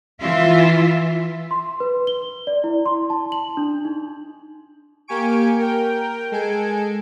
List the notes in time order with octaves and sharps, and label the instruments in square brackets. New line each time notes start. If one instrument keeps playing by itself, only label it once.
[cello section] E3 F4 E5
[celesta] C6
B4
G7
D5
E4
C6
A5
F#7
D4
D#4
[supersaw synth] A#3 G4 G#5 C#6 D7
A#4 G5
G#3 A4 G#5 D7